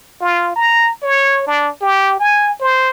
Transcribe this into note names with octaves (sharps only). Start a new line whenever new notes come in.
F4
A#5
C#5
D4
G4
G#5
C5